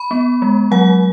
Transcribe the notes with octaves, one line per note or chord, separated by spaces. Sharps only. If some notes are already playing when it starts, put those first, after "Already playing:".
Already playing: B5
B3
G#3
F#3 F#5